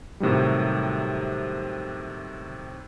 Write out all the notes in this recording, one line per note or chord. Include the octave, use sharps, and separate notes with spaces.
A2 C3 D#3 F#3 G3